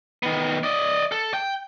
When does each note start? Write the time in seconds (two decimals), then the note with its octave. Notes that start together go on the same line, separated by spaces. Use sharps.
0.23 D#3 B3
0.63 D5 D#5
1.12 A4
1.34 G5